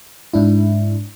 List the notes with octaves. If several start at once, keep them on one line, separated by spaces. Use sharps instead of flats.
G#2 D4 E4